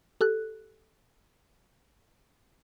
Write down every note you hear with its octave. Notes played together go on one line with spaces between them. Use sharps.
G4 A4 F#6